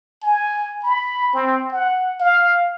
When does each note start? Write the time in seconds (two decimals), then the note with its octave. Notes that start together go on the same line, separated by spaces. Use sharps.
0.23 G#5
0.83 B5
1.34 C4
1.72 F#5
2.21 F5